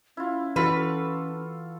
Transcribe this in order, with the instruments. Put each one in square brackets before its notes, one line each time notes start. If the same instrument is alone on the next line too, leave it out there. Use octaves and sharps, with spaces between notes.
[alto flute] C#4 [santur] E4 F4
[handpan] E3 F#4 [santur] A4 F5 C6 [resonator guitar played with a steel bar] B4